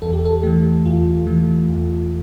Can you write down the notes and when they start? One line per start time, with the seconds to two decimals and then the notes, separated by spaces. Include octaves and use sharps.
0.02 E2 A4
0.13 G4
0.25 A4
0.43 E3 A3 G4
0.85 E2 F4
1.27 E3 A3
1.69 E2